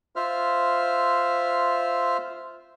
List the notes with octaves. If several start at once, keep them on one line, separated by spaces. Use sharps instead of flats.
F4 C5 E5 F6